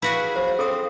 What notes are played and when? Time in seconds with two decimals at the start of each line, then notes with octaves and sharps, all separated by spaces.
0.02 E4 F#4 G#4 B4 F5
0.36 F#3 C5
0.59 C4 A4 D#6